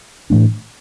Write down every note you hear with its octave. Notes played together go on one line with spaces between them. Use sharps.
A2 E3 A3 D4